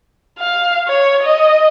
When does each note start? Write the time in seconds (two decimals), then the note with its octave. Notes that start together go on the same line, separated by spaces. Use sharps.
0.39 F5
0.88 C#5
1.23 D#5